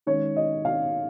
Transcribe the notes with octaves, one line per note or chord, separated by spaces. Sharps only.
D#3 G#3 C#4 C#5
D#5
F5